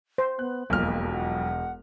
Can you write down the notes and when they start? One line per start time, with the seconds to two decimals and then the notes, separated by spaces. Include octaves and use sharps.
0.18 C5
0.39 B3 F#6
0.70 E1 B1 F2 A#3 F6
1.13 F#5